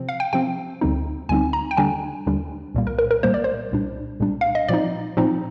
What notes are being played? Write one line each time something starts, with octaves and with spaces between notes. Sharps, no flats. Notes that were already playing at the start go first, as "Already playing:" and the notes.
Already playing: C3 F3 C4
F5
G5
C3 F3 C4 G5
D2 D3 G3 C4 D#4
D2 D3 G3 C4 D#4 G#5
A#5
G5
D#2 D3 G3 D4 G#5
D#2 D3 G3 D4
C2 A#2 G3 A#3
A#4
A#4
A#4
C2 A#2 G3 A#3 C5
D5
C5
C2 A#2 G3 D4
C2 A#2 G3 D4
F5
D#5
A#2 F3 C4 D#4 D5
A#2 F3 C4 D#4